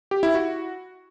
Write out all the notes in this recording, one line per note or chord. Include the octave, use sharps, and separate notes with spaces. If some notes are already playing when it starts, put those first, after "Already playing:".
G4
E4
F#4